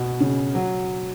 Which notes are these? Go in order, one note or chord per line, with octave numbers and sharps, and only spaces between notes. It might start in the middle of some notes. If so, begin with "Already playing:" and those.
Already playing: B2
C#3
F#3